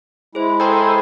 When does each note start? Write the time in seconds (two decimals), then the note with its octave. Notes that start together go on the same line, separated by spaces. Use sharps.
0.35 G#3 E4 G#4 C5
0.60 G#4 A4 C5 G5 A#5 C6